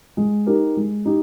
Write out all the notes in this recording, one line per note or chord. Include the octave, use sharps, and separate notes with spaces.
G#3
D#4 G4 A#4
G#3
D#4 G4